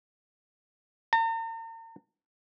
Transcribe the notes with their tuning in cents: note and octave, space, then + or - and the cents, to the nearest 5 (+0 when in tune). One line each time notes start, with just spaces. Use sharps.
A#5 -45